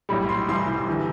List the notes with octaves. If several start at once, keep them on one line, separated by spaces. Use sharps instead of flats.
B1 A2 G3 B5
C6
C2 C3 E3 G3 C6
G1 E3 G3